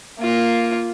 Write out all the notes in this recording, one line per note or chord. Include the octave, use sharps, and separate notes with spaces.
A#3 F4